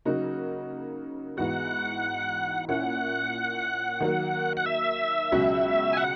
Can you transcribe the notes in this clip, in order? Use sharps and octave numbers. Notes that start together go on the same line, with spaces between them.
C#3 F#3 A#3 D#4 F#4
G#2 E3 B3 D#4 F#4 F#5
A#2 A#3 C#4 E4 F#5
D#3 F#3 A#3
F#5
E5
C#2 B2 F#3 C#4 F#4
G#5
F#5